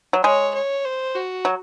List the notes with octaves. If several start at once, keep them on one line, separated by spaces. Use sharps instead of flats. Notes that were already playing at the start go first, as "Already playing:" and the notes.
F#3
G#3 C#5
C#5
C5
F#4
F#3